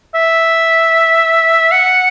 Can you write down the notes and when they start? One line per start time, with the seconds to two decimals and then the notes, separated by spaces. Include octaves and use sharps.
0.15 E5
1.72 F#5